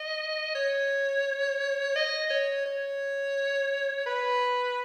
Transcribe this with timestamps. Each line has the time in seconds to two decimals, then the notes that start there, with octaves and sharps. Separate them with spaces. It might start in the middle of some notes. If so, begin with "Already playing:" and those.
Already playing: D#5
0.55 C#5
1.96 D#5
2.30 C#5
2.65 C#5
4.06 B4